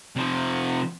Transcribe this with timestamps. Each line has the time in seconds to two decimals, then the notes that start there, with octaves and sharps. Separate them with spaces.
0.17 C3 F3